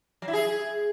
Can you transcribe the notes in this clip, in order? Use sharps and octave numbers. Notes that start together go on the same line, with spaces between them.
F#3
E4
G#4